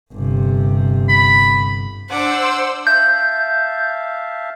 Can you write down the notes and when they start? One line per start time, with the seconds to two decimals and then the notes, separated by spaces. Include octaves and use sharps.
0.13 G1 C3
1.09 B5
2.09 D4 C5 F#5 D6 E6
2.87 E5 F5 A5 G6